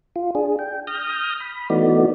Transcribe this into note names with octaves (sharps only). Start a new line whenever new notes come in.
F4
D4 G#4
G5
D#6 F6 G6 A#6
B5
E3 A3 B3 D#4 F#4 D5